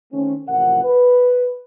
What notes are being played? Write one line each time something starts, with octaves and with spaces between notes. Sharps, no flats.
D#3 A3 C4 C#4
A1 C3 F3 A#4 F#5
B4